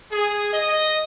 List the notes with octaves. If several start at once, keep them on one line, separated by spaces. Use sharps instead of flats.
G#4
D#5